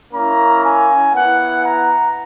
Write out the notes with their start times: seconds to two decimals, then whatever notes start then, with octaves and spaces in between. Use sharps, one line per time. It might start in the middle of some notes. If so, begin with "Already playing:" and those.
0.13 A#3 C#4 E4 A#5
0.64 G#5
1.13 B3 E4 F#5
1.64 A#5